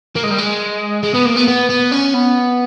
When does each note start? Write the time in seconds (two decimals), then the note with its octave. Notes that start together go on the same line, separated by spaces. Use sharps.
0.16 A#3
0.23 G#3
0.31 G3
0.38 G#3
1.04 G#3
1.15 B3
1.26 A#3
1.37 B3
1.48 B3
1.70 B3
1.92 C#4
2.14 B3